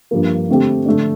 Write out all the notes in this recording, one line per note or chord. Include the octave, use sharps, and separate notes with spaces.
G2 F3 A#3
D3 A3 C4 G4
D3 A3 D4